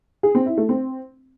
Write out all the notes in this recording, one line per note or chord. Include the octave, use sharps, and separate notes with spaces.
G#4
C4
E4
A3
C4